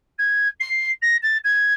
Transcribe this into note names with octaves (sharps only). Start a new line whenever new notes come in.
G#6
C7
A#6
A6
G#6